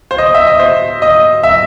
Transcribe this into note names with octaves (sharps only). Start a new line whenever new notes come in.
C5
D#5
E5
D#5
C5
D#5
E5